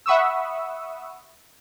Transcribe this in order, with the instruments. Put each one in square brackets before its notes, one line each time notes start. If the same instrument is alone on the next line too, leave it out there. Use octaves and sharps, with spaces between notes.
[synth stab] E5 F#5 B5 C#6 D#6 E6